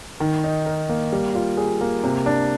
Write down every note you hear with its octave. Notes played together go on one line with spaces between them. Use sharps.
D#3
D#4
A#4
A#3
G3
F4
G#4
A#3
C3
D4